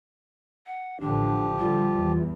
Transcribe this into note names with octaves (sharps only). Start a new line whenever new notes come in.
F#5
A1 D3 F3 D4 G4
D3 G3 F4
E2